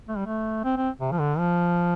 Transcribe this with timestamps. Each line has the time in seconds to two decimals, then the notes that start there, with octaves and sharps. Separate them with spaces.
0.08 A3
0.17 G3
0.26 A3
0.64 C4
0.76 C4
1.01 C3
1.11 F3
1.19 D3
1.38 F3